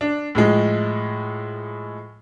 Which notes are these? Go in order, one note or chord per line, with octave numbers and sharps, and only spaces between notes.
D4
A2 F3 G#3